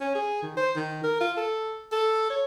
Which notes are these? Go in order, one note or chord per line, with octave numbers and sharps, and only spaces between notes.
C#4
G#4
D#3
C5
D#3
A#4
F4
A4
A4
C#5